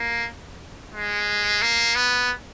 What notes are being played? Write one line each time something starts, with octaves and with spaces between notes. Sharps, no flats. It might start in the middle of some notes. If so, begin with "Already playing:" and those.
Already playing: A#3
G#3
A#3
B3